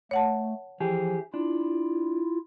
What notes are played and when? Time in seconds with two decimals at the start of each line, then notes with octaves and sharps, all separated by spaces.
0.11 A3 C#5 F#5 A5
0.80 E3 F3 G4 G#4
1.34 D4 E4 F4